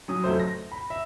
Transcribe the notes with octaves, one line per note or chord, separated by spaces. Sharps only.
F#3 C#4 D#6
F1 F#3 A3 C5
A#6
B5
E5